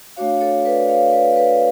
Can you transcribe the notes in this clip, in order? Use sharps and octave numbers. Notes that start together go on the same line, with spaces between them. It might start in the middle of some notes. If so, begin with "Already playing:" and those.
A3 D4 F#4 C#5 F5
A4 C#5
B4 D5
C#5 F5
B4 D5
B4 D5